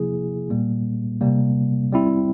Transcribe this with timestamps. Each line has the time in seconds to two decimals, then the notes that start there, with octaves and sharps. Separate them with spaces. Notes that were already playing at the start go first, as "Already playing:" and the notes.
Already playing: C3 F3 A#3 E4 G#4
0.50 A#2 G3 A#3
1.21 C3 G3 A#3
1.92 G3 C4 E4